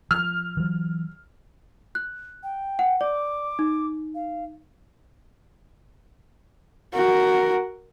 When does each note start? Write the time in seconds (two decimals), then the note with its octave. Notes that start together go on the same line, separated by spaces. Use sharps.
0.11 F3 F6
0.57 E3 F#3
1.95 F#6
2.43 G5
2.79 F#5
3.01 D5 D6
3.59 D#4
4.15 F5
6.94 F#4 A#4